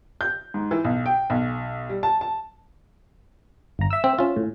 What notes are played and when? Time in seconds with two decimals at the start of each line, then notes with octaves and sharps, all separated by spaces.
0.21 G6
0.54 G#2
0.71 E3
0.85 B1
1.06 G5
1.30 B1
1.89 G3
2.03 A5
2.21 A5
3.79 G1 A#5
3.90 E5 E6
4.04 C4
4.19 C#4 F4
4.36 A2